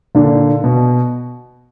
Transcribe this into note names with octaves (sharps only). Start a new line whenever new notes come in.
A#2 D3
B2